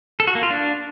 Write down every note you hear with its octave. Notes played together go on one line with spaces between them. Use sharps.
A4
F#4
A#3
F4
D4